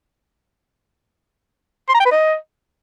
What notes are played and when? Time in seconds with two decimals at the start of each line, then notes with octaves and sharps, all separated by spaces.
1.89 C6
1.94 A#5
2.00 G5
2.05 B4
2.11 D#5